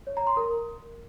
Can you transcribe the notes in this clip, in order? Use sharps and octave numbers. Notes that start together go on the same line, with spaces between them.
C#5
A#5
C6
A#4